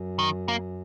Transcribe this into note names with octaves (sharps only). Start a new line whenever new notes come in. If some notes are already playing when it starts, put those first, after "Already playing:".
Already playing: F#2
D#3
A#3